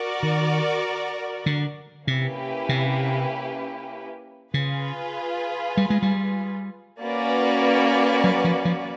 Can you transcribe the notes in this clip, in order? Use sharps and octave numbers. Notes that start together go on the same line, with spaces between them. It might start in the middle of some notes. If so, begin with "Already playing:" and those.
Already playing: F#4 A#4 D5
D#3
D3
C3 A#3 C#4 E4 G4 B4
C3
C#3 F4 G#4 B4
G3
G#3
G3
A#3 C#4 F#4 B4 D5
F#3
F3
F3